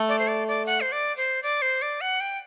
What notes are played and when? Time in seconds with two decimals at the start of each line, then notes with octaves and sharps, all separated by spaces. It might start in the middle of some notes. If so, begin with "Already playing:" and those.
Already playing: A3
0.09 D5
0.19 C5
0.28 D5
0.48 D5
0.66 F#5
0.81 C5
0.92 D5
1.17 C5
1.43 D5
1.62 C5
1.82 D5
2.01 F#5
2.20 G5